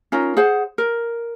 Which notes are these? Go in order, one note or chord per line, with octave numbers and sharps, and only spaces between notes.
C#4 D#4 F4 A#4
G#4 C5 F#5
A#4